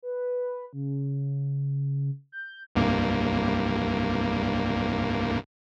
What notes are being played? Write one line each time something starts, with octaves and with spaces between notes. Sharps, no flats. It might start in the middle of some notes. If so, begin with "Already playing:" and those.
B4
C#3
G6
C2 G2 A#3